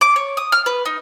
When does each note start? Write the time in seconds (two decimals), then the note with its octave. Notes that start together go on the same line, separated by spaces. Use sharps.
0.01 D6
0.16 C#5
0.37 D#6
0.52 F6
0.66 B4
0.85 D#4